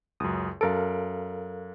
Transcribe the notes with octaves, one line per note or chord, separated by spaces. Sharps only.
C#2 F#2 D#6
F#2 A4 A#4 F5 A6 D7